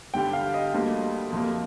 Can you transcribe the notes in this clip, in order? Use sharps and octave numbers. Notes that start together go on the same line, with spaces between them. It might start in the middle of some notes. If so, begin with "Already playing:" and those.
G2 D3 G3 G5
F5
D#5
D2 D3 G3 A#3
F2 C3 F3 A#3